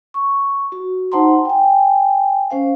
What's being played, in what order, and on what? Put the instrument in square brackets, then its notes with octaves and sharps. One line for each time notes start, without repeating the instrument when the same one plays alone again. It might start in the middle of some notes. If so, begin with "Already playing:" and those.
[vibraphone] C#6
F#4
D#4 C5 F#5 A5 A#5 C6
G5 G#5
C#4 C5 F5